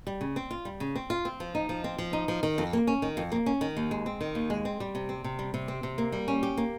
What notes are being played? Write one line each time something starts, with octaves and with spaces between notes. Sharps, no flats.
G3
C#3
C4
F4
G3
C#3
C4
F4
C4
F3
D#4
F3
C4
F3
D#4
F3
D#3
F2
A#3
C#4
D#3
F2
A#3
C#4
D#3
D#2
G#3
C4
D#3
D#2
G#3
C4
G3
C3
C4
C3
G3
C3
C4
C3
A#3
G3
C#4
G4
A#3